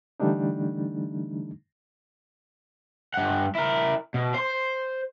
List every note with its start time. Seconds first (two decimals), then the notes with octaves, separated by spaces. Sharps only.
0.20 D3 E3 G3 A3 D4 D#4
3.14 G2 F#5
3.55 E4 A#4
4.14 B2
4.34 C5 C6